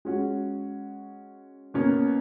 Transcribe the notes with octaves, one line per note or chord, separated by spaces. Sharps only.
G#3 C#4 F#4
B2 A#3 C#4